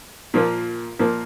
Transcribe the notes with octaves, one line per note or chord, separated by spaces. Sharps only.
A#2 F3 A#3
A#2 F3 A#3